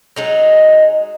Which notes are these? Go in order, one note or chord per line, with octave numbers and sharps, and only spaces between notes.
F#3 G#3 D#4